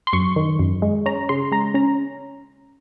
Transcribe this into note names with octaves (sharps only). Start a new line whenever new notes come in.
C6
F#2 C#6
D#3
F#2
G#3
C#4 A#5
C#3 C6
G#3 A#5
C#4 A#5